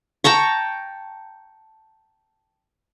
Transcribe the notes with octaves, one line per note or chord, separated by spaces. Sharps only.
G5 A5 A#5 C#6